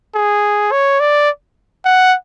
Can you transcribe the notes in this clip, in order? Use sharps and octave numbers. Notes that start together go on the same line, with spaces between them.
G#4
C#5
D5
F#5